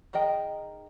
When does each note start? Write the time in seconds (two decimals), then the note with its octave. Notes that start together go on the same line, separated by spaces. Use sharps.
0.13 D#3 D#4 G#4 D#5 G5